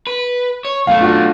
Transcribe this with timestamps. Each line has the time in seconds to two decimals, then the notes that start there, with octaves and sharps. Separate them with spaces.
0.07 B4
0.65 C#5
0.87 B1 A3 F5
1.00 D4 F4 F#4